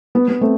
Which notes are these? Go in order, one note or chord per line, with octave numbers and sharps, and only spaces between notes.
B3
B3
A3 C4